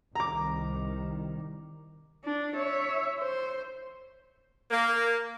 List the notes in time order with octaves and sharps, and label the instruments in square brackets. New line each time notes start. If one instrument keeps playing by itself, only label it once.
[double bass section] C2 D#3 [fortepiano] A#5 D6
[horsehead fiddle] D4
C#5 E5
C5
[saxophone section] A#3